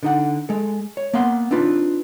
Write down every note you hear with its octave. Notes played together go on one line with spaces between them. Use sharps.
D3 D#4 F#5
G#3 A4
C#5
A#3 B3 F5 F#5 C6
C4 D4 D#4 F4 B4